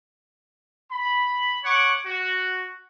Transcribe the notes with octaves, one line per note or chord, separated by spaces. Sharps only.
B5
C#5 F#5 C#6 D6
F#4